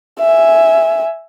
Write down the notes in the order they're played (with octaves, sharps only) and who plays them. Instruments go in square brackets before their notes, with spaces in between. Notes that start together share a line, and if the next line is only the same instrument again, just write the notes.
[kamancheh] E5 G#5